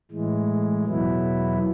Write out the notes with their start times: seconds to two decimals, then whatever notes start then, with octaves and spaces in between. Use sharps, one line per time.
0.11 A2 E3 G#3
0.85 E2 B2 F#3 B3 E4